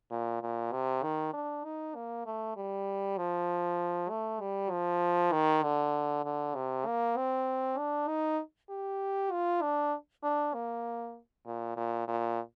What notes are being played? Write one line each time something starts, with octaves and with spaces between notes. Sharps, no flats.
A#2
A#2
C3
D#3
D4
D#4
A#3
A3
G3
F3
A3
G3
F3
D#3
D3
D3
C3
A#3
C4
D4
D#4
G4
F4
D4
D4
A#3
A#2
A#2
A#2